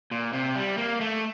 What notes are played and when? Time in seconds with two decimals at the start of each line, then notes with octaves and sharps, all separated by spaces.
0.11 A#2
0.33 C3
0.56 G3
0.78 A#3
1.01 A3